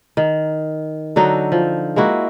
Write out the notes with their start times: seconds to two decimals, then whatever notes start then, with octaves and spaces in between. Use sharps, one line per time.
0.17 D#3
1.16 D3 F#3 D#4 A4
1.52 F3
1.96 G#3 A#3 E4 F#4